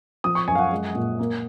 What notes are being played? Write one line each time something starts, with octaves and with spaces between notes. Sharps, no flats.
F3 D#6
C#6
F#2 G#5
F5
F#5
G#3
A#2
A#3